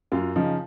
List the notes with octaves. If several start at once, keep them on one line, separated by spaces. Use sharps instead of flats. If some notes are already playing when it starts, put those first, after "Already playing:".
F#2 F4
C#3 F3 D#4